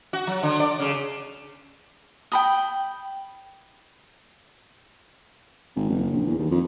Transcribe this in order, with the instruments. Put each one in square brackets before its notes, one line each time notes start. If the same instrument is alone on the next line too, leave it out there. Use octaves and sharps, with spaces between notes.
[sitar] F#4
F#3
D3
D5
C#3
[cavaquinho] G5 B5 D#6
[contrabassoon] G#1
F#1
A#1
E2
D#2
F2